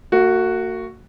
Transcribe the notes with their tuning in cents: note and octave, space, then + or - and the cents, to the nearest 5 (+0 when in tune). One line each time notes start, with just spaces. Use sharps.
A#3 -45 F#4 +0